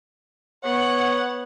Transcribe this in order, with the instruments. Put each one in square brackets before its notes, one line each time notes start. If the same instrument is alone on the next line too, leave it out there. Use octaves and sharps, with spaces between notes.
[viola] B3 [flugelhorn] C#5 [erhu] F#5